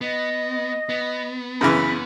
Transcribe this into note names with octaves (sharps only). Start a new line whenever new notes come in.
B3 D#5
B3
F#2 C#3 E3 B5